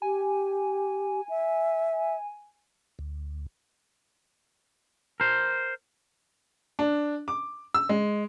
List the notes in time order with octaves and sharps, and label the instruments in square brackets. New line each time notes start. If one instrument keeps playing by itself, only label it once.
[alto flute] G4 [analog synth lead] G#5
[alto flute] E5
[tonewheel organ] D2
[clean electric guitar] A#4 C5
[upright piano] D4
D6
E6
G#3